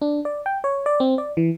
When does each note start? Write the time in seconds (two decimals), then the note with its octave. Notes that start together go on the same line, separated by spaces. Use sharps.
0.02 D4
0.25 D5
0.46 G5
0.64 C#5
0.86 D5
1.00 C4
1.18 D5
1.37 E3